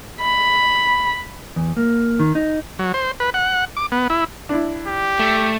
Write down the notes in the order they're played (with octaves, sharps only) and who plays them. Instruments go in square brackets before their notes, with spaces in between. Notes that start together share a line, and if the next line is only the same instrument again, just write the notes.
[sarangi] B5
[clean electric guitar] E2
A#3
D#3
D#4
[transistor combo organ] F#3
C5
B4
F#5
D6
B3
E4
[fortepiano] D4 E4
[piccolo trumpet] G4
[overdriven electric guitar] A3